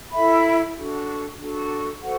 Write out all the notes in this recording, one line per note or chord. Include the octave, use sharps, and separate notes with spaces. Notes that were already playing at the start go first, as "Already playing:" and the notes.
E4 A4 E5 B5
D4 F#4 A4
D4 F#4 A4
F#4 A4 C5 F#5